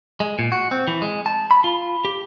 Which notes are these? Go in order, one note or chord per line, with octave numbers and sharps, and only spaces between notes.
G#3
A#2
F#4
C4
E3
G#3
A5
B5
F4
G4